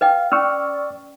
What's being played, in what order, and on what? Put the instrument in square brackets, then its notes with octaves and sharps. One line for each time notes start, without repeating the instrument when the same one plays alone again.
[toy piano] B4 D#5 G5 [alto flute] F5
[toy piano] C#4 [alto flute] D5 [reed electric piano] C#6 E6 F6